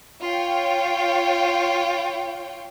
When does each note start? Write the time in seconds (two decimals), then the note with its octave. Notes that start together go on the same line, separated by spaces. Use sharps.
0.23 F4 C#5 G5